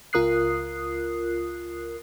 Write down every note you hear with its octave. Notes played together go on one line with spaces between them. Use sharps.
C#2 F4 A#4 D#6 F#6 C7